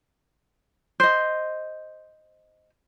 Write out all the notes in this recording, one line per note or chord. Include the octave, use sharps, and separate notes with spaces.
C5 D#5